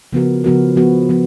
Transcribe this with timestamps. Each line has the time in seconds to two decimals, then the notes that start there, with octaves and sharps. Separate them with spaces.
0.13 C#3 F3 B3 F#4 A#4
0.44 C#3 F3 B3 F#4 A#4
0.76 F3 B3 F#4
1.09 F3 B3